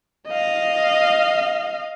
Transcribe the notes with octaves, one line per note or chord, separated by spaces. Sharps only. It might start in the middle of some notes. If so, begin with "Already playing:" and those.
D#5 F5